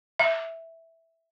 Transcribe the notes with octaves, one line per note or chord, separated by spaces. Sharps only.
E5